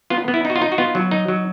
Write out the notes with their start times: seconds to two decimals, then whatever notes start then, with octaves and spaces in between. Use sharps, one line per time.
0.10 B3 F4
0.28 B3
0.34 E4
0.45 D#4
0.50 F#4
0.56 F4
0.62 D#4
0.72 F#4
0.78 B3 F4
0.95 F#3
1.11 D#4
1.28 F#3